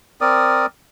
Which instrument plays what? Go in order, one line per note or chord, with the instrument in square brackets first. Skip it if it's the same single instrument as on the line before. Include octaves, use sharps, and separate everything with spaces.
[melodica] C4 A#4 D5 D#6